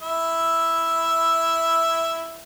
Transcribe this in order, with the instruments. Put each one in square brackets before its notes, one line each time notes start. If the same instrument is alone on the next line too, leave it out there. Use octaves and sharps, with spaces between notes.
[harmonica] E4 E5